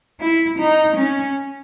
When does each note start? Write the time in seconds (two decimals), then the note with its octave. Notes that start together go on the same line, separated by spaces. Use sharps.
0.20 E4
0.59 D#4
0.97 C#4